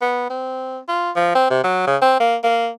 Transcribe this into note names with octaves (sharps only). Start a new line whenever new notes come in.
B3
C4
F4
F3
C4
C3
F#3
C#3
C4
A#3
A#3